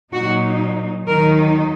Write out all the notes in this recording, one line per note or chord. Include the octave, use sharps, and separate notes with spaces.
A#2 F#3 D#4 F#4
D#2 D#3 F#3 D#4 A#4